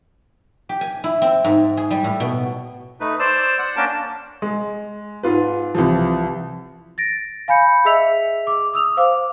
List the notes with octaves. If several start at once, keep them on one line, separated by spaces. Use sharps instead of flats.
G4
G#5
E4
C4
G#2
G#4
G3
A2
B2
A3 D#4 B4
C5 D5 E6
F#5
A#3 C#4 D4 A#4 G5 A5
G#3
G#2 F4 B4
C2 E3 F3
A6 A#6 D7
F5 G#5 B5 G6 C#7
G#4 D#5 E5 E6 B6 F7
D6
D#6 E6 F7
C5 F5 D6